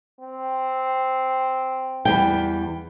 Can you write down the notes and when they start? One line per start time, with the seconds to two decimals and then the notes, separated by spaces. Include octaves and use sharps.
0.21 C4
2.05 E2 G3 G5